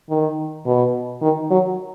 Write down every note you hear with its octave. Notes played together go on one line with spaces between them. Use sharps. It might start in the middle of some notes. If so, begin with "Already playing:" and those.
D#3
B2
D#3
F#3